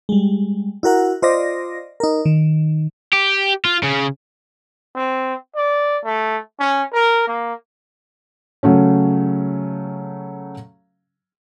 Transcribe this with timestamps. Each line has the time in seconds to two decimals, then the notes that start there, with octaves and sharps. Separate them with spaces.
0.09 G3 G#3
0.83 E4 F#4 A#4 F#5
1.22 F4 C5 D5 D#5 A#6
2.00 D#4 A#4
2.25 D#3
3.13 G4
3.65 F4
3.83 C#3
4.95 C4
5.56 D5
6.04 A3
6.60 C#4
6.93 A#4
7.28 A#3
8.63 C#3 F#3 A3 C#4